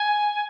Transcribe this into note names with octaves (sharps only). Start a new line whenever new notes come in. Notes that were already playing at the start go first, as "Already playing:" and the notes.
Already playing: G#5